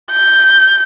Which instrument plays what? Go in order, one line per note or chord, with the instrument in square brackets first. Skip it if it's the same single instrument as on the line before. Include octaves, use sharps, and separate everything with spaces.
[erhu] G6